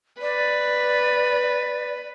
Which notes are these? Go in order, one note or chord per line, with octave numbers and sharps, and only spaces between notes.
B4 D5